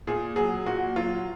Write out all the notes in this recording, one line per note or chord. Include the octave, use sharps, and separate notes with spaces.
A#2 G#4
F#3 G#4
A#2 F#4
F#3 F4